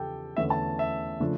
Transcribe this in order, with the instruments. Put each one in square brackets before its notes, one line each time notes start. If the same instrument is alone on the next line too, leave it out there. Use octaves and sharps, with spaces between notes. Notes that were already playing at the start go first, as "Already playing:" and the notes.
Already playing: [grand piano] E2 C#3 F3 G4 A4 G5
E2 D3 A3 C#4 E5
A5
E5
C#3 F3 A3 D4